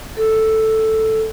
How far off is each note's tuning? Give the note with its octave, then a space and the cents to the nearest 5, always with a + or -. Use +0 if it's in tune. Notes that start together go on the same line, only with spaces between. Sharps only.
A4 +0